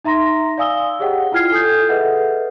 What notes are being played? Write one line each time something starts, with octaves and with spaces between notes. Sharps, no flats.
D#4 E5 A#5 C6 A#6
D5 F5 G#5 D#6 E6 G7
G4 G#4 C#5 D#5 F#5 G5
E4 F4 G5 F6 G#6 C7
A4 G#5 D#6 G6
G#4 A4 B4 D#5 E5 F#5